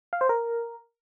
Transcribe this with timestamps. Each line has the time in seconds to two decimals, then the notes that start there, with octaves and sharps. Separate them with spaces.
0.13 F5
0.21 C5
0.29 A#4